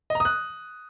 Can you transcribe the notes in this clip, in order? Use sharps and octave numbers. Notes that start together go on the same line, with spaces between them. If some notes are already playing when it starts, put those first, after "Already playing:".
D#5
A#5
D#6
F#6